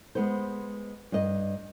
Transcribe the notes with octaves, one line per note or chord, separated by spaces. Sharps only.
G#3 B3 C5
G2 D#5